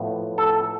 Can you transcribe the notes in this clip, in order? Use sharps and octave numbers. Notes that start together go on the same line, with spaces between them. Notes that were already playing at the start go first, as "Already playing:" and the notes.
Already playing: A2 F3 B3
A4